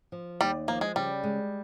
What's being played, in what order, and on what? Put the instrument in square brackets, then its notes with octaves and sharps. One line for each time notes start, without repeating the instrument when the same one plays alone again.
[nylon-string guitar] F3
[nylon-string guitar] D#2 [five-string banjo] G3
[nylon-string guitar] F3 [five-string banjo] A#3
[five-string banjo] G#3
[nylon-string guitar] C#3 [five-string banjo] G3
[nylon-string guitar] G#3